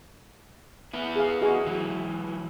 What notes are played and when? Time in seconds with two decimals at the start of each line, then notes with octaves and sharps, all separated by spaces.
0.94 B3 E4
1.16 G#4 F5
1.42 F#4 G#4 D#5
1.67 E3 F#3